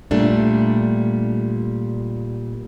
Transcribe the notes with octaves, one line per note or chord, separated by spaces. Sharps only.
A#2 G3 A3 D4